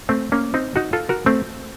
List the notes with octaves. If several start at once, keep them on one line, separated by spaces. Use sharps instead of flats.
A3 C4
A#3 C#4
C4 D#4
D#4 F#4
F4 A4
F#4 A#4
A3 C4